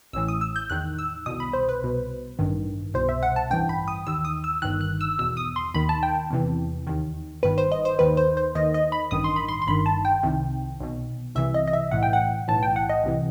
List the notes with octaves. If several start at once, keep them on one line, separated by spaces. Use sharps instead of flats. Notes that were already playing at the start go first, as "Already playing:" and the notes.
A1 A2 E3 E6
D#6
E6
G6
E2 D#3 F#6
E6
C2 B2 D#6
B5
C5
B4
C2 B2
A1 G2 D#3
C2 B2 C5
E5
F#5
A5
A1 G2 E3 G5
B5
D#6
D#2 D#3 E6
D#6
E6
G1 G2 D#3 F#6
F#6
E6
E2 B2 E6
D#6
C6
D#2 D#3 B5
A5
G5
E2 C3 E3
D#2 D#3
G1 G2 D#3 B4
C5
D#5
C5
D#2 D#3 B4
C5
C5
D#2 D#3 D#5
D#5
B5
A1 G2 D#3 D#6
C6
B5
C6
C6
G1 G2 D#3 B5
A5
G5
C2 C3 D#3
B1 B2
C2 C3 E3 E5
D#5
D#5
E5
B1 A2 E3 F#5
G5
F#5
B1 A2 E3 A5
G5
F#5
D#5
C2 C3 E3